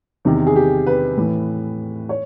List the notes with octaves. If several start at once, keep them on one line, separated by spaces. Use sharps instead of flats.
E2 C3 D#3
G#4
G4
B4
A2 E3
C#5